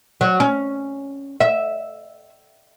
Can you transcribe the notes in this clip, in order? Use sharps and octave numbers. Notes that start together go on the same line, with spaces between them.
F#3
C#4
E5